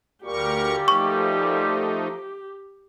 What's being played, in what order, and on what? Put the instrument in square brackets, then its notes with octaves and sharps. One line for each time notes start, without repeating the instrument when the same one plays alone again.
[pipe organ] D2 A#4 C#6 [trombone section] A#2 G3 [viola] G4
[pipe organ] F3 A3 D#4 [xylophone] C#6